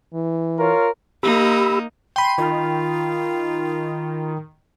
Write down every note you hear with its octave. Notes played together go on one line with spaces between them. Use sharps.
E3
F4 A#4 C#5
A#3 D#4 G4 B5 E6
G5 B5 C6 D#7
D#3 F4